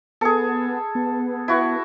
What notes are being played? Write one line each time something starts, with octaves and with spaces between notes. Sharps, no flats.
B3 G#4 A4
B3
E4 F#4